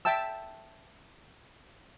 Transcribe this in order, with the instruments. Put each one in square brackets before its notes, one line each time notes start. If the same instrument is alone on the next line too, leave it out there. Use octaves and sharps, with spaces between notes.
[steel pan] E5 G5 A5 E6